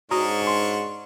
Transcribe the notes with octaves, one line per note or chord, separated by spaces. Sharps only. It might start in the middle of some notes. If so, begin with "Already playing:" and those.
G#2 C#4 D4 F#4 A#5 C#6 D#6
C6